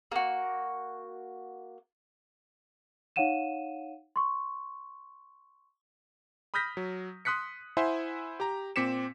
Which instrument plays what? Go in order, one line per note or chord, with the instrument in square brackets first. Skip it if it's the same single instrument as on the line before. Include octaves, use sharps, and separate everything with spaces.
[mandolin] A#3 F#4
[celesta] D#4 C#5 F5 F#5 D#7 E7
C6 C#6
[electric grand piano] B5 D#6 F6 G6 A#6 B6
F#3
C6 D#6 F#6 B6 C#7
E4 C5 E5 F#5 G#5 C6
G4 A#5
A#2 C4 D6 B6 C#7 E7